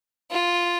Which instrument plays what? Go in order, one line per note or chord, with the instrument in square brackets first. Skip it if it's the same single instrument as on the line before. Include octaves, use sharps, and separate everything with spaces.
[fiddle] F4